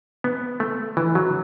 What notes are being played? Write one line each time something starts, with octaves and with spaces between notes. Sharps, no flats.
B3
A3
E3
F#3